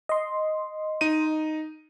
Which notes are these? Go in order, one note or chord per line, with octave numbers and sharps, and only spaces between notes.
D#5 C6
D#4 D#7